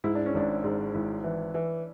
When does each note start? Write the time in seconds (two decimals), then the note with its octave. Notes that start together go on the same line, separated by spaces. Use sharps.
0.04 G#2 E4
0.15 D4
0.26 C#4
0.34 G#1 D4
0.64 G#2
0.94 G#1 E4
1.24 E3
1.54 E3